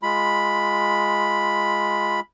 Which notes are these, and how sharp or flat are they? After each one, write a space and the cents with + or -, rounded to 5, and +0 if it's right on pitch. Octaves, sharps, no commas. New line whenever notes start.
G#3 +0 F4 +0 B5 +0